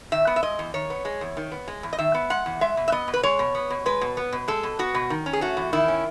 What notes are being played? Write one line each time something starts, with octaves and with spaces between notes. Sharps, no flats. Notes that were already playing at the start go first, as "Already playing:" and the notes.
D#3 E5
B3
E5
G#3 D#5
E2
D#3 C#5
B3
G#3
E2
D#3
B3
G#3
E2
D#5
D#3 E5
B3
G#3 F#5
E2
G#3 E5
B2
E5
B3 D#5
B2
B4
G#3 C#5
B2
B3
B2
G#3 B4
B2
B3
B2
G#3 A4
B2
B3 F#4
B2
D#3
C#4
G#4
A3 F#4
E2
D#3 E4
C#4